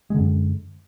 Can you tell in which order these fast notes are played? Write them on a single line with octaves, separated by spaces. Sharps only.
G#3 D3 F#2